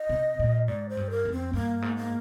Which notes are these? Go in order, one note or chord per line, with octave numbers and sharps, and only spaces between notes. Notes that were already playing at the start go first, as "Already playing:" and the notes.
Already playing: D#5
C3
A#2
G#2 D5
C5
G2
A#4
F2
C4
G2 A#3
G#2
A#3